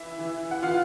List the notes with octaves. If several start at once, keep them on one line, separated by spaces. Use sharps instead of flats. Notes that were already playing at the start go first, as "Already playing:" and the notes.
Already playing: E3 E4 E5
E3
F#5
E3 F4 F5